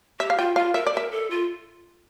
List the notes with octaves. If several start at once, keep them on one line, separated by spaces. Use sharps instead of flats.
G4 E5
F5
F4 G5
F4 F5
A#4 E5
D5
A#4 E5
A4
F4